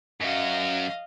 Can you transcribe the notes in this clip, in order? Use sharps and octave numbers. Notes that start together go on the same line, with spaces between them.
F#2 F#4 D#5 F5